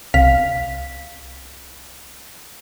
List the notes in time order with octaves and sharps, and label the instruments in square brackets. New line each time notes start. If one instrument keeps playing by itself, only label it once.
[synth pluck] C2 F5 B6